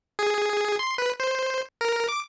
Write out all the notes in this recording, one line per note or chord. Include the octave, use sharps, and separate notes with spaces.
G#4
C6
B4
C5
A#4
D6